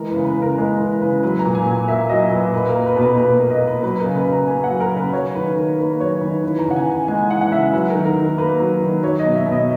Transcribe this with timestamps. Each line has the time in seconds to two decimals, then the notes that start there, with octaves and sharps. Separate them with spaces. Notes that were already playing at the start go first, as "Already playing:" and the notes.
Already playing: E3 G#3 A#4
0.10 C#3 B4
0.25 B4
0.36 C#3
0.42 A#4
0.58 G#3 B4
0.79 E3 A#4
1.01 C#3 B4
1.23 F#3 B4
1.39 A#5
1.45 A#2
1.55 G#5
1.67 A#2
1.88 A#3 E5
2.09 F#3 D#5
2.31 A#2 B4
2.53 A#3 B4
2.69 A#4
2.75 A#3
2.86 B4
2.96 B2
3.02 B4
3.17 B2 B4
3.39 A#3
3.50 D#5
3.61 A#3
3.67 B4
3.83 F#3 B4
3.99 C#3 A#4
4.16 B4
4.26 C#3
4.32 A#5
4.47 A#3 G#5
4.64 F#5
4.69 F#3
4.80 A#4
4.91 C#3
4.97 B4
5.13 F#3 C#5
5.35 D#3 B4
5.56 D#3 A#4
5.78 A#3 B4
6.00 F#3 C#5
6.21 D#3 B4
6.44 E3 B4
6.59 A#5
6.65 C#3
6.71 F#5
6.76 G#5
6.87 C#3 G#5
7.08 G#3 G#5
7.30 E3 F#5
7.41 F#5
7.51 C#3 E5
7.73 F#3 B4
7.90 A#4
7.95 D#3
8.05 A#4
8.17 D#3
8.38 A#3 B4
8.60 F#3
8.81 D#3
9.03 F#3 C#5
9.19 D#5
9.25 B2
9.35 E5
9.46 B2
9.52 D#5